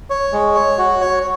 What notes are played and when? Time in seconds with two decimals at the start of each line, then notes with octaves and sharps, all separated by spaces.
0.10 C#5
0.33 G#3
0.55 C#5
0.78 F#4
1.01 C#5